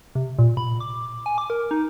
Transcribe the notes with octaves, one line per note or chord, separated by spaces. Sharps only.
C3
A#2
B5
D6
G#5
D6
A#4
D#4